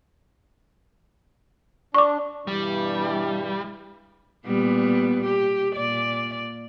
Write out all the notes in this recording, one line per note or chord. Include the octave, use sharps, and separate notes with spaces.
D4 C#6 D6
G2 B2 E3 G3
A#2 G3 B3
G4
A#2 D5